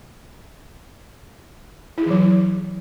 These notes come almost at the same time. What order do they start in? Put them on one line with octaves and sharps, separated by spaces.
E4 G#4 E3 F#3